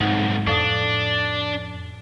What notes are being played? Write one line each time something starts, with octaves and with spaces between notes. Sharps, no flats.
B1 F2 G#2 D#4 F#5
F2 A2 F3 D4 D#6